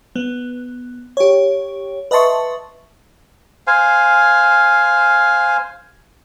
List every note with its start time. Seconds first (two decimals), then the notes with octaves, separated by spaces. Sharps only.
0.16 B3
1.17 G4 C#5
2.11 B4 D#5 E5 A5 C6 C#6
3.67 C5 F5 G#5